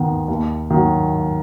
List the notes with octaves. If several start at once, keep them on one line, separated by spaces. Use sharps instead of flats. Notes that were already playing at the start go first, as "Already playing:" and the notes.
Already playing: D#2 D#3 B3
D#2
D#3 F#3